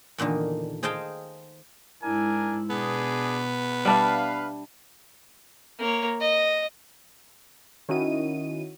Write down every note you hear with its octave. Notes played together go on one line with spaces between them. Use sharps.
E2 A#2 D3 D#3
G#4 C5 D#5 F5 G5 A5
G#2 D4 E4 A#4 G#5
B2 B3 D4 G#4
G3 D4 B4 E5 F5
A#3 C#5
D#5
D#3 C#4 E4 F#4 D#5 D#7